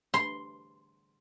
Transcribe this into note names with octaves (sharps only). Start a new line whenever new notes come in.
C6